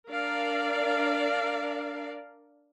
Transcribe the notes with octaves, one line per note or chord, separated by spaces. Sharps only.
D4 A#4 D5 F5